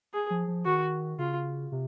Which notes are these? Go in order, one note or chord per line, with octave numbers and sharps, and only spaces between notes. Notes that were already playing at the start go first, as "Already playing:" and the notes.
G#4
F3
F3
D#3 F#4
C#3 F4
C3